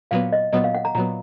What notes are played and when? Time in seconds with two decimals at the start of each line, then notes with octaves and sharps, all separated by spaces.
0.11 A#2 F#3 B3 F5
0.32 D#5
0.53 A#2 F#3 B3 D#5
0.64 F5
0.74 F#5
0.85 A#5
0.95 A#2 F#3 B3 A#5